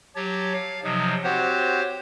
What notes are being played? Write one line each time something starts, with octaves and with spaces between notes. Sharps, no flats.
F#3 G4 C#5 A5
F5
C3 F3 F#3 D#4
C4 F#4 G4 C5 C#5